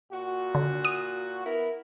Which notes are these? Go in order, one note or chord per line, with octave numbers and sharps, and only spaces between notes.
A#2 F#4
D3
D#6
B3 E4 A#4